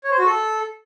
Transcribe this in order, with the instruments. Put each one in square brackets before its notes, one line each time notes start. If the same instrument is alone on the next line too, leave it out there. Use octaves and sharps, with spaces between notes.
[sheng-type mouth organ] C#5
C5
F#4
A4